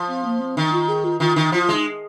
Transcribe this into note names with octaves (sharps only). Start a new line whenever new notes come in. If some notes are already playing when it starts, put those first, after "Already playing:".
Already playing: F3
C4
A#3
C4
D#3 D#4
F4
G#4
F4
D#3 F4
D#3 D#4
F3 F4
F4
G#3 D#4